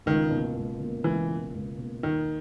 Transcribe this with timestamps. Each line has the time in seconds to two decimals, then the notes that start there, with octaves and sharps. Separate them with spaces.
0.06 C#2 D#3
0.30 B2
0.36 A#3
0.56 C#2
0.80 B2 A#3
1.04 C#2 E3
1.30 B2 A#3
1.54 C#2
1.78 B2 A#3
2.03 D#2 D#3